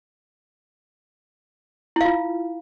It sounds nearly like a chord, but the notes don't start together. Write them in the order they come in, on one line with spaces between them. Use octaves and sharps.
E4 F5 F4